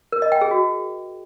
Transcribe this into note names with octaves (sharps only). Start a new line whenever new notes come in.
A#4
D#5
G5
G#4
F#4